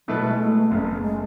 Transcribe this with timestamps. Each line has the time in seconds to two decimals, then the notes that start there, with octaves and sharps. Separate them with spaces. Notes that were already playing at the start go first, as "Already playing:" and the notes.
0.08 B2 F#3 A3 E4 B4
0.23 G#3
0.39 A3
0.70 F#1 F#2 C#3 B3
0.87 A3
1.02 G#3